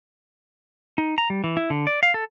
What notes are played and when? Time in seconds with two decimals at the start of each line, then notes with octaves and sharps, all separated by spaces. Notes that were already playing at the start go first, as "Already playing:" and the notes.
0.98 D#4
1.18 A#5
1.30 G3
1.44 E3
1.57 E4
1.70 D3
1.87 D5
2.03 F5
2.14 A4